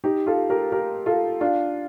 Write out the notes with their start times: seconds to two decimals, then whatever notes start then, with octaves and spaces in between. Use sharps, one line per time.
0.04 D#4 G4
0.27 F4 A4
0.50 G4 A#4
0.72 G4 A#4
1.06 F4 A4
1.41 D4 F4